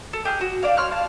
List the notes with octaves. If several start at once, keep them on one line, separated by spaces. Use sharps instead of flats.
A4
G4 G#4 F6 F#6
F#4
D4 D5 F5
C#5 C6 F6 F#6
F5 A5